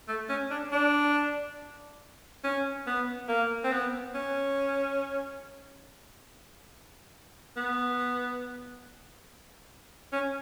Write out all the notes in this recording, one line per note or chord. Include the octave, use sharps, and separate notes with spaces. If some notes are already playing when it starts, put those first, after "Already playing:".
A3
C#4
D4
D4
C#4
B3
A#3
C4
B3
C#4
B3
C#4